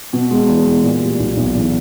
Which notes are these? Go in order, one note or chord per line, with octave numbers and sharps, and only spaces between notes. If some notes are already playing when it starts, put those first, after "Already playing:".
B2
G#3
E2
E2
A#2
G3
B1
B1
E2